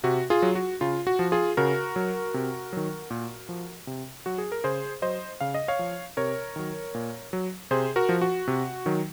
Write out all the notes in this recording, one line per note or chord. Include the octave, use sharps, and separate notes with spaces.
C3 F#4
F4 G#4
F#3
F#4
C#3 F4
F#4
F3
F4 G#4
C#3 F#4 A#4
F#3
C3
D#3 F#3
A#2
F3
C3
F#3 F#4
G#4
A#4
C#3 G#4 C5
F#3 C5 D#5
C#3 F5
D#5
C#5 F5
F3
C3 A#4 C#5
D#3 F#3
A#2
F#3
C3 G#4 C5
F#4 A#4
F3
F#4
C3
D#3 F#3